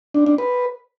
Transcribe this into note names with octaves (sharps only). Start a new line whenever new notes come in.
D4
D4
B4